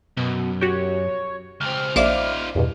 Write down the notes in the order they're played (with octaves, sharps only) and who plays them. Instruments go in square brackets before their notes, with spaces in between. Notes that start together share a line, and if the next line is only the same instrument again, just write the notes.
[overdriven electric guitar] F#2 [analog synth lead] B2
[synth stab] F#4 G4 [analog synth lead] C#5
[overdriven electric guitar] C#2 C4 [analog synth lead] F6
[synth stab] A#1 F5 D6 [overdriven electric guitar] D#4 F4 [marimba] C5 D5 E5
[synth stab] E2 G2 B2